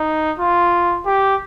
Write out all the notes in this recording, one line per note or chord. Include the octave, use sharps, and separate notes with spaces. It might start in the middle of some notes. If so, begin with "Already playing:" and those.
Already playing: D#4
F4
G4